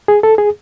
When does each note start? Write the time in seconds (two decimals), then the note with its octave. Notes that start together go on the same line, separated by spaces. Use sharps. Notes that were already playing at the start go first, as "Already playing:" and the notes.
0.08 G#4
0.23 A4
0.38 G#4